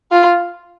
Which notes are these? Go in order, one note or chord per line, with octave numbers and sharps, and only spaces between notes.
F4